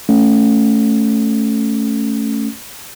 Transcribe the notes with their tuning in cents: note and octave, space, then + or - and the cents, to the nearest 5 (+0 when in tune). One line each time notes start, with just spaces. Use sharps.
A3 +0 C#4 +0